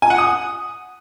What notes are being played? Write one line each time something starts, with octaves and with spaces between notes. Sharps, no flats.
G#5
F#5
D#6